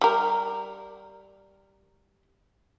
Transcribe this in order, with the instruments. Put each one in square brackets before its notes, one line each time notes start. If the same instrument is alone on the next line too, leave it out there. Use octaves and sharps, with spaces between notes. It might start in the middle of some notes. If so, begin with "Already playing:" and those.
[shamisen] G3 A#4